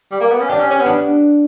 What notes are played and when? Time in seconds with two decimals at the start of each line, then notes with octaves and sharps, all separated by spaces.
0.11 G3
0.20 A#3
0.30 B3
0.40 C#4
0.49 D4 G4
0.60 C#4
0.70 C#4
0.80 B3
0.86 D4